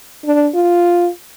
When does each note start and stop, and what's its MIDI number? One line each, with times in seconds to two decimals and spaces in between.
0.25 0.48 62
0.55 1.09 65